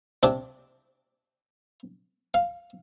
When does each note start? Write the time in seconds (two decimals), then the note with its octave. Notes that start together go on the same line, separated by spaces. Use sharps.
0.23 C3 D4
2.34 F5